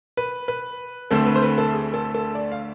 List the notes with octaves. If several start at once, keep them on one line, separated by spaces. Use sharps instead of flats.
B4
B4
D2 D3 A3 C4 A4
B4
C5
B4
A4
G#4
A4
A4
D5
F5